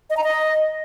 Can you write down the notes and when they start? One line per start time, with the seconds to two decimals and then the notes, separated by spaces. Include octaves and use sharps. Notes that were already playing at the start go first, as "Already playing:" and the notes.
0.10 D#5
0.17 A#5
0.24 D#5